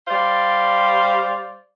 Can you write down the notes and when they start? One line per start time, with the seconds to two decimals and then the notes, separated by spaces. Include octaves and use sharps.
0.08 G3 C5 D5 F5